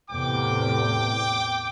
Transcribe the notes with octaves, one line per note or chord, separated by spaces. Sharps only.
E2 A2 C3 G5 D6